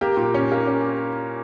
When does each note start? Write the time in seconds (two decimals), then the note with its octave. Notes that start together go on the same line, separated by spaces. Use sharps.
0.01 A#3 G4
0.17 A#2
0.34 C#4
0.52 A#3
0.67 C#4